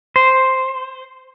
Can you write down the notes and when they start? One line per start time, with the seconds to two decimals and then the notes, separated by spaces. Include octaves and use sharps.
0.16 C5